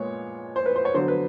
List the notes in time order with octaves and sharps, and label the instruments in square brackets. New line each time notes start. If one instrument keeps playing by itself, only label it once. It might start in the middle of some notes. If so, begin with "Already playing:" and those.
Already playing: [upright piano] A#2 F3 G#3 B3 C#5
C5
B4
C5
C#5
D3 F#3 B3 C5
B4